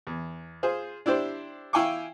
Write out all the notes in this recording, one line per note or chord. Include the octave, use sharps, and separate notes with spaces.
E2
F4 G#4 C5
D4 E4 G4 C5 D5
E4 F5 G5 G#5 C#6 D6